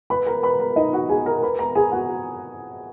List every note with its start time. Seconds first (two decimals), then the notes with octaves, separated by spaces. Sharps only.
0.10 B4 B5
0.26 A#4 A#5
0.43 B4 B5
0.59 A#4 A#5
0.76 D#4 D#5
0.93 F#4 F#5
1.09 G#4 G#5
1.26 A#4 A#5
1.42 B4 B5
1.59 A#4 A#5
1.75 G#4 G#5
1.92 F#4 F#5